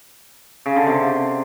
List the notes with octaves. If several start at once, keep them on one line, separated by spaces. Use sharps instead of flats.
C#3
D3
C3